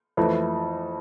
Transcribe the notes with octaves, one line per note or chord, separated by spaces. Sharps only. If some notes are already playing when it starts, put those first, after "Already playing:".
F2 E3 A3